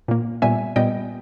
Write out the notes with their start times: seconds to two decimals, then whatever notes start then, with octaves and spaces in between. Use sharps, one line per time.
0.08 A#2 A#3
0.42 A#2 G3 B3 E5 G#5
0.76 A#2 G3 B3 D#5 G5